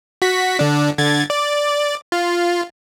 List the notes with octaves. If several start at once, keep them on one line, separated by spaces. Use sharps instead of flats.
F#4 B6
D3 D4
D3 G#6 A6
D5
F4